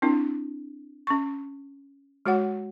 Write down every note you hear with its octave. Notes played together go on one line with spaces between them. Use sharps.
C4 D4 E4
C#4 C#6
G#3 F#4 C#5 F#5